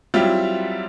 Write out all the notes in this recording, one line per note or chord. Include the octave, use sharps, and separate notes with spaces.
F#3 G3 C4 E4 F4